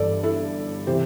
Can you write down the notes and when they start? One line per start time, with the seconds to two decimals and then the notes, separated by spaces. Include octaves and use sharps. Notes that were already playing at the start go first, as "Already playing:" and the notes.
Already playing: G1 G2 E3 A4 D5
0.23 E4 A4
0.87 C3 E3 G4 C5